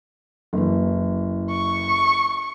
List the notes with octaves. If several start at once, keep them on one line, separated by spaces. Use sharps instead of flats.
F#1 E3
C#6